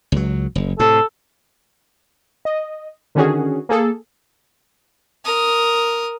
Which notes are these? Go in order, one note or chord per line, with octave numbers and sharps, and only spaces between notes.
C#2 F#3
F#1
A2 C3 A4
D#5
D3 D#3 C#4 F#4 G#4
A#3 G#4 A4
A#4 D#6